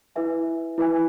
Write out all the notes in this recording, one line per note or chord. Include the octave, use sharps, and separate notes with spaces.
E4 B4 E5 G#5
E4 B4 E5 G#5